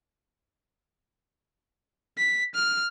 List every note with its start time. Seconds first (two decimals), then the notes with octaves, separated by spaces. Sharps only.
2.18 B6
2.55 F6